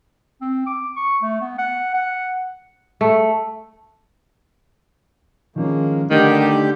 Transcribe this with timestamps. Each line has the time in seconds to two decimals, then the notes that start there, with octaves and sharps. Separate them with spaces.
0.41 C4
0.66 D6
0.96 C#6
1.22 A3
1.41 B3
1.59 F#5
1.94 F#5
3.01 A3
5.56 G#2 D#3 F3 A#3 C#4
6.11 D3 D#3 A3 D4 D#4 G4 G6